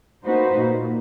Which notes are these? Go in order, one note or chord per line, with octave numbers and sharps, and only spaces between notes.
A#3 D#4 F#4 B4 C5
A#2